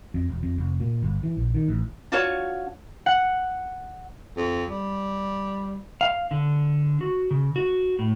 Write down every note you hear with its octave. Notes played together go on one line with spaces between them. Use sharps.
F2
E1
F2
F1
A#2
G1
E3
A#1
D#3
A1
D4 F4 F#4 C#5
F#5
F2
G3
F5
D3
F#4
C#3
F#4
A2